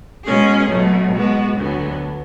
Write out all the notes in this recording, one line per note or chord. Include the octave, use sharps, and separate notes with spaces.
B2 G#3 C#4 G#4
B2 F#3 A3
B2 G#3 B3 F#4
D2 D3 F#3 B3